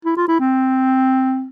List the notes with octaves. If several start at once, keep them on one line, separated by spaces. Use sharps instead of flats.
E4
F4
E4
C4